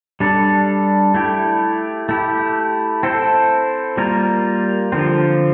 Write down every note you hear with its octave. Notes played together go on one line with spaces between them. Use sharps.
G3 D4 A4 D5
A3 E4 G4
A3 E4 G4
C4 E4 A4 C5
G3 A#3 F4 A#4
D3 F3 C4 F4